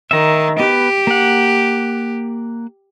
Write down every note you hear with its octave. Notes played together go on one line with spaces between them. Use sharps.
D#3 E5 A#5
B3 G4 B4
A#3 F#5